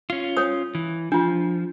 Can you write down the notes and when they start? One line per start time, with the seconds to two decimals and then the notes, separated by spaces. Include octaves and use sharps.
0.10 C#4 F4
0.37 C#5 D#6
0.75 E3
1.12 F3 D4 F4